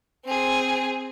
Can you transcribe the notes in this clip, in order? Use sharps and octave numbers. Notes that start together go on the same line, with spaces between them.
C4 G#4